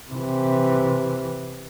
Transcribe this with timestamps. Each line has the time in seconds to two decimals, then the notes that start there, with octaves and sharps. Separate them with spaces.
0.10 C3 E3